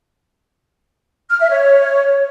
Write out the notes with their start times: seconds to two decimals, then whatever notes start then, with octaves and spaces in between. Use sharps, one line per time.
1.30 F6
1.40 E5
1.50 C#5